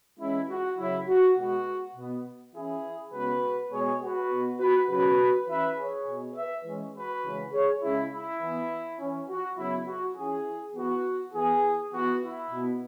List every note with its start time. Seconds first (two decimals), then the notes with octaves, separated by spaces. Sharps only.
0.20 E3 G#3 C#4 E4
0.49 F#4
0.78 C#3 F#3 C#4 E4
1.08 F#4
1.37 B2 G#3 B3 F#4
1.96 B2 B3
2.54 E3 C#4 E4 G#4
3.13 C#3 G#3 B3 F#4 B4
3.71 B2 G#3 B3 G#4 C#5
4.01 F#4 B4
4.30 B2 B3
4.60 F#4 B4
4.89 C#3 F#3 C#4 F#4 B4
5.47 E3 C#4 B4 E5
5.76 G#4 C#5
6.06 B2 B3
6.35 B4 E5
6.65 E3 G#3 C#4
6.95 F#4 B4
7.24 C#3 E3 G#3 C#4
7.53 G#4 C#5
7.82 C#3 G#3 C#4 E4
8.11 E4
8.41 E3 B3
8.99 E3 C#4
9.29 F#4
9.57 C#3 F#3 B3 E4
9.87 F#4
10.16 E3 C#4 E4 G#4
10.75 E3 B3 F#4
11.34 E3 B3 E4 G#4
11.93 E3 B3 F#4
12.22 E4
12.51 B2 B3